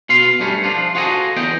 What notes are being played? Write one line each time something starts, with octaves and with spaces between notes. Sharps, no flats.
B2 F4 F5 C6
G2 G3 A3 C#4
F3 D4 F4
F4 F#4 G#4 A4 D#5
E2 B3 D#5 G5